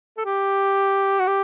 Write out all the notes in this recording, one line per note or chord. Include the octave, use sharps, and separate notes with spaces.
A4
G4
F#4
G4